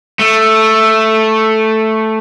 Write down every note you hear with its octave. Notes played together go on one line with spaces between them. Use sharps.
A3